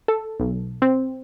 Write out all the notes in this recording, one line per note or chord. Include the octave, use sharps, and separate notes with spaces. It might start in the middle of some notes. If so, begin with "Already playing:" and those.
A4
B1
C4